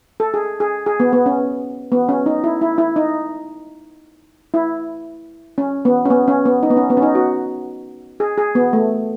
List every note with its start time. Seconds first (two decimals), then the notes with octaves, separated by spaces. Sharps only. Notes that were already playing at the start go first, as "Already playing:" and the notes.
0.20 A4
0.34 G#4
0.60 G#4
0.86 G#4
1.00 B3
1.13 B3
1.26 C#4
1.92 B3
2.09 C#4
2.26 D#4
2.44 E4
2.61 E4
2.78 E4
2.96 D#4
4.54 E4
5.58 C#4
5.85 B3
6.05 C#4
6.10 B3
6.28 C#4
6.46 B3
6.63 D#4
6.70 B3
6.77 C#4
6.90 B3
6.97 C#4
7.02 D#4
7.15 F#4
8.20 G#4
8.38 G#4
8.55 B3
8.73 A3